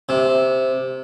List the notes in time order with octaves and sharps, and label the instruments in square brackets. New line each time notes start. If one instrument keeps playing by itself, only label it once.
[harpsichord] C3